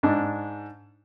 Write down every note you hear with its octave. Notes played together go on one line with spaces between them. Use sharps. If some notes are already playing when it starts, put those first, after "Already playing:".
G#2 D4